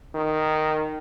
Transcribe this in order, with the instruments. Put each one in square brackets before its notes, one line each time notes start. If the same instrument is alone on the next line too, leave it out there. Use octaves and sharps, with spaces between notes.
[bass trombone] D#3